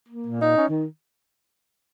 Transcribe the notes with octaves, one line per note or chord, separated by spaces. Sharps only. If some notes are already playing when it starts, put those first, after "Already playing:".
A#3
A#2
D#4
C#4
D#3